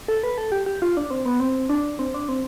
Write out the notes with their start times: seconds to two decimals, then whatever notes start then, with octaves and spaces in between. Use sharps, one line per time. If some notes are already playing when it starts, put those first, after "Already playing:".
0.08 A4
0.23 B4
0.38 A4
0.52 G4
0.66 G4
0.82 F4
0.97 D4
1.10 C4
1.26 B3
1.40 C4
1.69 D4
1.99 C4
2.14 D4
2.29 C4